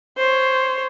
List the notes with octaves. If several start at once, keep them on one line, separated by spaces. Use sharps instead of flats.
C5 C#5